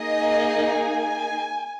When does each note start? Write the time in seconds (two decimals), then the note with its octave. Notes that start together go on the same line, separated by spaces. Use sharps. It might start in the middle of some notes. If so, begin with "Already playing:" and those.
Already playing: A#3 D#4 G#4 D#5
0.79 G#5